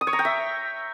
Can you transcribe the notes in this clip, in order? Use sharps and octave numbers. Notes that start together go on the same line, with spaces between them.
D#6
C#5
A#5
G5
E5